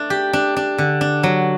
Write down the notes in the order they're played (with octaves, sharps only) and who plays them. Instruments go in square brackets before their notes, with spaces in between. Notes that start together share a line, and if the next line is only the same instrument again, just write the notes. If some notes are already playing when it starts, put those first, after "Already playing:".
Already playing: [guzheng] A3 D4
G4
D4
D4
D3
D4
F#3